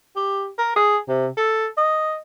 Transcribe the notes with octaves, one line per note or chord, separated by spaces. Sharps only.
G4
A#4
G#4
C3
A4
D#5